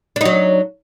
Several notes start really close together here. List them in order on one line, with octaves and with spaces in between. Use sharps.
D4 D#4 F#3